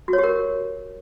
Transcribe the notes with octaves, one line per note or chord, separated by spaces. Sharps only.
F#4
C#5
G4
A#4